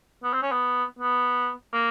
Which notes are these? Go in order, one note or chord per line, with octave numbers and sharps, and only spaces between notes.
B3
C4
C#4
B3
B3
A#3